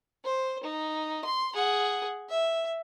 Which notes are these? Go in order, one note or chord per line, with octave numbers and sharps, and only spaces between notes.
C5
D#4
C6
G#4 F#5
E5